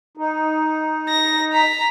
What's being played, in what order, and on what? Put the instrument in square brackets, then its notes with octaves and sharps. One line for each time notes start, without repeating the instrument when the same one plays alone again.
[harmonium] D#4
[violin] A#6
A#5 B6